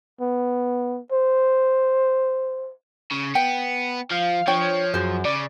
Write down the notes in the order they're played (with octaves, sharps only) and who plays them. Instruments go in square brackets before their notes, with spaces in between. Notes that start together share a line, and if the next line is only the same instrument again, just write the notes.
[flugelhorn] B3
C5
[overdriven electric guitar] C#3
[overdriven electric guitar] B3 [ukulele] G5
[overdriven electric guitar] F3 [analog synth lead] F5
[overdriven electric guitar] F3 [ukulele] D4 G5 [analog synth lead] C#5
[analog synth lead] F#2 [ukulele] F#4 G#4 C5
[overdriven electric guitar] C#3 [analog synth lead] D5